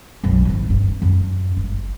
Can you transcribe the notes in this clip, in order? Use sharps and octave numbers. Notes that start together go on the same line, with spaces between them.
B1 F#2
G#1 E4
G2
F#2
G1